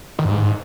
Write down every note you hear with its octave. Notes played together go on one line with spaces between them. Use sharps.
D#3
G2
G#2